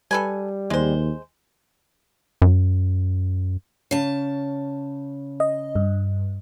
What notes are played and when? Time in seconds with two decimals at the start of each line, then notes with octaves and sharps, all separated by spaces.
0.11 G3 A4 B4 G#5
0.70 D#2 G#3 C5
2.42 F#2
3.91 C#3 A5
5.40 D#5
5.75 G2